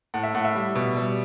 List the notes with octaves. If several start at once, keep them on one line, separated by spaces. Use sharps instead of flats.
A2 F#5
E5
A2 F#5
E5
G3
B2
G3